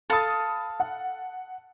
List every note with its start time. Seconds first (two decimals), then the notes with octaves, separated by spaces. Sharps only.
0.10 A4 F5 A5 B5 D#6
0.80 F#5